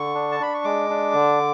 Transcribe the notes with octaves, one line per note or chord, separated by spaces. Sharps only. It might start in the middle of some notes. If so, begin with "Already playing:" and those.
Already playing: D3 C#6
D4
A5
D4 B5
C#6
G#3 D6
D4
D3